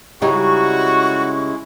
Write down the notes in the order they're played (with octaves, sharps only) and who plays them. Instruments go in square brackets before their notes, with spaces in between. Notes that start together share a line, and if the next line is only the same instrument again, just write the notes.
[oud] C#3 G3 D#4 [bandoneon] G#3 E4 [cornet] F#4 [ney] C#6